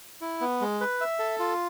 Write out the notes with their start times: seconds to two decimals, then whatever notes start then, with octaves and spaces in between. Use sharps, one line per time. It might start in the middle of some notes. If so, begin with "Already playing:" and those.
0.21 E4
0.41 B3
0.61 G#3
0.81 B4
1.01 E5
1.19 A4
1.39 F4